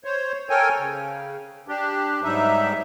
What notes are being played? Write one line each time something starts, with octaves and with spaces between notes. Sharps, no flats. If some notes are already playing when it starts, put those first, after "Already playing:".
C5 C#5
A4 A#4 C#5 G5 G#5
C#3
D4 G4
G#2 F#3 G3 D#4 E5